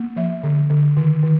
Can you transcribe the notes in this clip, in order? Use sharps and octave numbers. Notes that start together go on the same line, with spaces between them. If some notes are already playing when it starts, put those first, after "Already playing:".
Already playing: A#3 B3
F3 E5
D3
D3
D#3
D#3